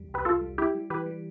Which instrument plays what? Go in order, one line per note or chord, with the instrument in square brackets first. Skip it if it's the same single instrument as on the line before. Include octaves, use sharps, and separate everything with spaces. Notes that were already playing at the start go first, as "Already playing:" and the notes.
Already playing: [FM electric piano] E2 G3
C2
[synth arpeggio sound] G4 B4
[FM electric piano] C2 [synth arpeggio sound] F4 A4
[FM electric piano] G3
[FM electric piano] G3 [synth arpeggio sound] E4 G4
[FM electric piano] G3
[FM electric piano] E3 [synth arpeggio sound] G4 B4
[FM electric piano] G3